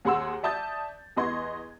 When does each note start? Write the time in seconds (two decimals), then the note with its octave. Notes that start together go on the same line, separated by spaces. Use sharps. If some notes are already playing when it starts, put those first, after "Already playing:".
0.05 D#2 G#4 F#5 C6 E6
0.43 D5 E5 A5 D#6 G6 A6
1.16 E2 B3 D#5 C6 C#6 G#6